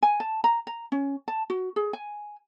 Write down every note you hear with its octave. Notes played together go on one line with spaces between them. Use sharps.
G#5
A5
A#5
A#5
C#4
A5
F#4
G#4
G#5